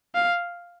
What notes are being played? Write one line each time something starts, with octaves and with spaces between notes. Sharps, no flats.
F5